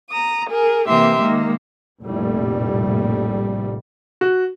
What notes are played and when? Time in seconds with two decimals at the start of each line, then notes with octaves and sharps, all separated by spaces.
0.11 A#5 D#6
0.50 G#4 A#4
0.88 C3 E3 A#3 G4 E5 C6
1.22 D#3 G#3 A#3
2.02 F1 A#1 A2 G3
4.21 F#4